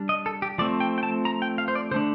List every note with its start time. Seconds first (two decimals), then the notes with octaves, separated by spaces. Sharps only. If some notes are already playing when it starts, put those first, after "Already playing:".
Already playing: G3 D4
0.09 D#5
0.26 A4
0.42 G4
0.58 F3 A3 C4 D5
0.80 G5
0.98 G5
1.03 A5
1.25 A#5
1.42 G5
1.58 F5
1.68 C5
1.75 D5
1.91 D3 C5
1.94 A3 D4